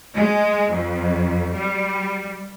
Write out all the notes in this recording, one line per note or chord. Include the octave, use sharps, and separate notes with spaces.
G#3
F2
G3